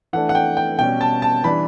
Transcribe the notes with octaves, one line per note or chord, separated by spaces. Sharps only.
E3 A3 D4 F#5
F#5
G5
G5
B2 G3 C#4 G5
A5
A5
E3 G3 D4 B5